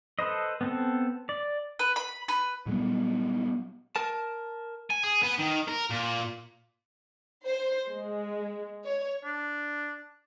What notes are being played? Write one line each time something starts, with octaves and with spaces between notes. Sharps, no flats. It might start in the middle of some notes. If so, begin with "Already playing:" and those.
A4 B4 C5 D#5
B3 C4 A4
D5
B4
B5
B4
A#2 F#3 G3 B3
A#4 A5
G#5
G#4
B3
D#3
A#4
A#2
C5
G#3
C#5
D4